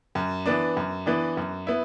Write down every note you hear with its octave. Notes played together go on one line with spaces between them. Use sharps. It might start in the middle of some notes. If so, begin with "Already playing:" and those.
F#2
E3 B3 D4
F#2
E3 B3 D4
F#2
B3 E4